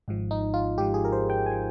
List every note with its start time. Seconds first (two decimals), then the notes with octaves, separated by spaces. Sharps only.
0.08 G#1 G#2 F3
0.31 D#4
0.54 F4
0.78 G#1 G#2 F3 G4
0.94 G#4
1.05 A#4
1.12 C5
1.30 G5
1.46 F3 G#5